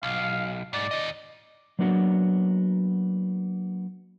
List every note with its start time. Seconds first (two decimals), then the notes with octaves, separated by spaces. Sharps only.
0.03 B1 F5
0.73 G#2 D5
0.91 D#2 D#5
1.79 F#3 A#3 B3 D4 F#4